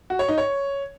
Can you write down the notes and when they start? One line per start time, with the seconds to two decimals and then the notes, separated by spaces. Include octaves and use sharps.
0.10 F#4
0.19 C#5
0.28 D#4
0.38 C#5